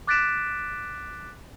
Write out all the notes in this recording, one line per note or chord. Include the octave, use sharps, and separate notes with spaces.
D6 F#6 A6 B6 D7 E7